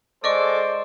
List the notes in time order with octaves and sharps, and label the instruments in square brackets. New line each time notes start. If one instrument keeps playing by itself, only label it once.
[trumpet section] G#3 A4 D6 [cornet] C5 [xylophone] D5 D#5 C#6